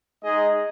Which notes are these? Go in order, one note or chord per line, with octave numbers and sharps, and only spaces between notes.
G#3 D#4 G#4 D#5